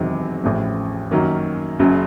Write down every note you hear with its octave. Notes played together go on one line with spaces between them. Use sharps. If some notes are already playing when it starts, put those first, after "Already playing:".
Already playing: E1 E2 C3 D#3 F#3
A1 A2 F3
F#2 D#3 F#3 A#3 C#4
F#1 F#2 C#3 F#3